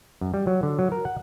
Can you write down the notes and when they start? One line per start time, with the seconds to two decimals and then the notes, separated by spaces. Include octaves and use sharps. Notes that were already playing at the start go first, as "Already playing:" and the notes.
0.21 F#2
0.34 G3
0.47 F#3
0.63 D3
0.79 F#3
0.92 A#4
1.05 F#5